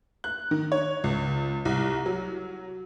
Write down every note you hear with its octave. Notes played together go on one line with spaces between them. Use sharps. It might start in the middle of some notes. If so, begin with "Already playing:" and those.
F#6
D#3
C#5
C#2
C2
F#3